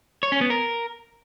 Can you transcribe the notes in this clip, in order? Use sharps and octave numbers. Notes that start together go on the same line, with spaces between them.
C#5
C#4
B3
A#4